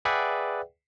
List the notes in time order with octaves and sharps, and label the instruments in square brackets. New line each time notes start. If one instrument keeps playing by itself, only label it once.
[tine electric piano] G#4 B4 D5 E5 F#5 G5